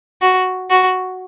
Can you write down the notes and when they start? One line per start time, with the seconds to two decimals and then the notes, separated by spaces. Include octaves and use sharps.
0.22 F#4
0.70 F#4